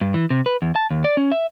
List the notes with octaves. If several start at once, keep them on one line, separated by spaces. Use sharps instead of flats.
G2
E3
C3
B4
E2
A5
D#2
D5
C#4
E5